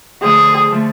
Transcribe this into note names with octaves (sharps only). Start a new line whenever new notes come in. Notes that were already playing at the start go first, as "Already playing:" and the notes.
D3 F3 A3 G#4
D3 F3 A3